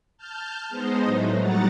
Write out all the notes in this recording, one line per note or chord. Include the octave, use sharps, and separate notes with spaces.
A5 F6 G6
G#3 B3 D#4 C5 D#5
A2 F#3 A3 D#4
F#3 G3 F#5 A#5 A6